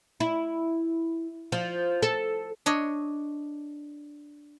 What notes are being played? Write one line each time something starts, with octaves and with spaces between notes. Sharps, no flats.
E4
F3
A4
D4 C#5 D#5